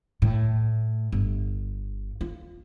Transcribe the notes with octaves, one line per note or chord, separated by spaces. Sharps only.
A2
G1
F4